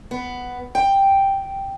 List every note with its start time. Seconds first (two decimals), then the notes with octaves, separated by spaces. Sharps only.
0.11 B3
0.75 G5